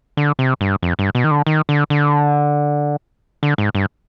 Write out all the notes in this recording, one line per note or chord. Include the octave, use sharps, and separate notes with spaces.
D3
C3
G2
F2
G2
B2
D#3
D3
D#3
D3
D3
D3
G#2
G2